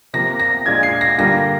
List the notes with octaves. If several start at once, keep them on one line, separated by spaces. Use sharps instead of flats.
C3 F3 A#3 A#6
A#6
A#2 G#3 D4 F4 G#6
C7
A#6
G2 D3 G3 A#3 F4 A#6